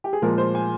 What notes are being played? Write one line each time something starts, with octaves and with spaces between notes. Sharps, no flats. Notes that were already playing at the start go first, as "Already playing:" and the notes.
G4
G#4
A#2 F3 G#3 A#4
C5
G#5